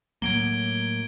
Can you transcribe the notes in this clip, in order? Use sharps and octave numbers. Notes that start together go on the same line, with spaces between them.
A2 F#3 A#3 G#6 D7 G7